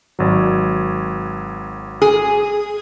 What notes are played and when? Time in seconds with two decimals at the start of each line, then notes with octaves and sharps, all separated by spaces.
0.19 G#1 F#3
2.02 G#4